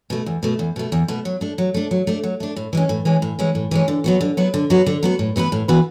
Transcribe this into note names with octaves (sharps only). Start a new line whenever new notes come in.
B2 A3
E2
B2 A3
E2
B2 A3
E2
B2 A3
F#3
A3 D4
F#3
A3 D4
F#3
A3 D4
F#3
A3 D4
A2
E3 G#3 C#4
A2
E3 G#3 C#4
A2
E3 G#3 C#4
A2
E3 G#3 C#4
D3
F#3 B3 F#4
D3
F#3 B3 F#4
D3
F#3 B3 F#4
D3
F#3 B3 F#4
A2
E3 B3 F#4 B4
A2
E3 B3 F#4 B4